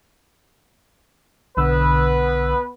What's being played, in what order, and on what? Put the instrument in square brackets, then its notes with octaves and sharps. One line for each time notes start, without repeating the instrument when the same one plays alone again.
[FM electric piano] B1 D3 E6 [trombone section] B3 B4